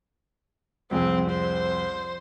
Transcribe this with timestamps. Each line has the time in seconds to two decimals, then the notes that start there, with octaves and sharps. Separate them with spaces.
0.91 C2 F2 C4 G#4
1.30 C5